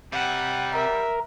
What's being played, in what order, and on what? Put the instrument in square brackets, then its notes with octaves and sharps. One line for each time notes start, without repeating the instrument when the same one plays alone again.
[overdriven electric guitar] C3 [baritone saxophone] G3 [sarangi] F#5
[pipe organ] A#4 [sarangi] E5